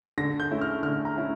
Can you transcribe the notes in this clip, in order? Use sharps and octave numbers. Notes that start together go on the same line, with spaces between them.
D3 A#6
G6
A3 C#4 E4
F6
D3 F6
A#5
A3 C#4 E4